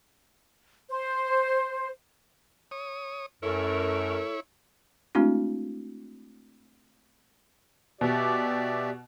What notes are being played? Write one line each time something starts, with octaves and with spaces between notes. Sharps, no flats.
C5
C#5 D#6
F#2 A3 E4 A4 A#4 C#5
G#3 A3 C4 D4 E4 F#4
B2 G4 D5 E5